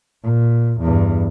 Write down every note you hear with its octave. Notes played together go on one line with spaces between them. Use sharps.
A#2
E2 G2